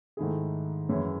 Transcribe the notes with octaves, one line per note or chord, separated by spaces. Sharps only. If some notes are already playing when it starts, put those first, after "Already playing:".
G#2 D#3 A3 E4 G#4
F#2 E3 G#3 C#4 E4